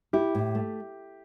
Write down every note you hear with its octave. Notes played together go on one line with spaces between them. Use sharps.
E4 G4
A2
A3